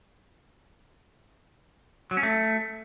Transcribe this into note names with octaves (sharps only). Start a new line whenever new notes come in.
F#3
C#4
A3